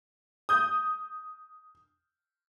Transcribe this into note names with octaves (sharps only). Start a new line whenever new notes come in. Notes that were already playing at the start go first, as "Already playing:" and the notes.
D#6 G6